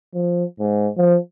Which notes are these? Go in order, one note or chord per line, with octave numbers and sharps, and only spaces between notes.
F3
G#2
F3